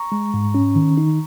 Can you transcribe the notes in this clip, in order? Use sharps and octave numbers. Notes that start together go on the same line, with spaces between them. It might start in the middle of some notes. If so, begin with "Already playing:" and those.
Already playing: A#5 C#6
G#3
G#2
C#4
D#3
D#4